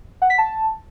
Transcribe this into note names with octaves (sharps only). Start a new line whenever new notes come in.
F#5
B6
A5